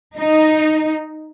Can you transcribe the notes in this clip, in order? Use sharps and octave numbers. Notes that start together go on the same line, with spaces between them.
D#4